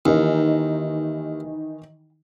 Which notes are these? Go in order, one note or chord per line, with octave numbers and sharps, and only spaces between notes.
D#2 D#3 E3 D#4